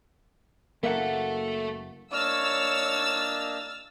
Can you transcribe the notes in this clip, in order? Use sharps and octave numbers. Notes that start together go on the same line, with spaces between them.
F#1 D#2 A3 A#3 A4 E5 F#5
A#3 D4 C#5 D#5 E6 F6 A6